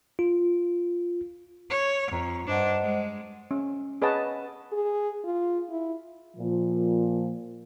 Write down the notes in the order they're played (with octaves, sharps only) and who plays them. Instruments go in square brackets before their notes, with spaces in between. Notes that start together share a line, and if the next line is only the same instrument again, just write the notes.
[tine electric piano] F4
[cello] C#5
[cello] F2 [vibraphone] A#5
[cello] G2 D4 [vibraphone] C5 D#5 F#5
[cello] G#3
[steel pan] C#4
G#4 B4 C#5 D#5 F#5 A5
[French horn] G#4
F4
E4
[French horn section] A#2 F3